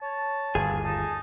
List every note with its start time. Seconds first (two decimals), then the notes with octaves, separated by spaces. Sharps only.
0.01 C#5 A5
0.55 G1 D#2 G#4
0.84 D#4 A5